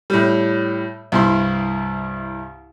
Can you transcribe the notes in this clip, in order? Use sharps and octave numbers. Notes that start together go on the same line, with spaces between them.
A2 G3
C2 G2 E4 C5 C6